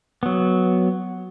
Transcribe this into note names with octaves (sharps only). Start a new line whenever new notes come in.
F#3 B3